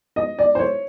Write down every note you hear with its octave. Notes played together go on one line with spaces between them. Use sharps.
D#5
D5
C5
C#5